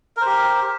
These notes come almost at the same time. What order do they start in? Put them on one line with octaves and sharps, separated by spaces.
A#4 C5 G4